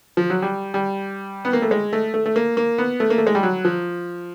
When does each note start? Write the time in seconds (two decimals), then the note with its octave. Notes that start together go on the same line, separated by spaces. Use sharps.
0.17 F3
0.30 F#3
0.42 G3
0.74 G3
1.45 B3
1.53 A#3
1.62 A3
1.71 G#3
1.93 A3
2.14 A3
2.26 A3
2.36 A#3
2.57 A#3
2.78 B3
3.00 A3
3.10 A#3
3.18 A3
3.27 G#3
3.35 G3
3.43 F#3
3.65 F3